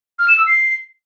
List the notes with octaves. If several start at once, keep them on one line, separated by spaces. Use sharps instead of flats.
F6
E7
E6
C7